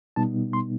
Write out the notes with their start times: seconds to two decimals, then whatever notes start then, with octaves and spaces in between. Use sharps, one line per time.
0.16 B2 G3 B3 D#4 A5
0.53 C6